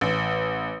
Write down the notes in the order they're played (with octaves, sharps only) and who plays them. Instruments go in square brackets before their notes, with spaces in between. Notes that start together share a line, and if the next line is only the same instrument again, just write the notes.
[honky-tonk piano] A1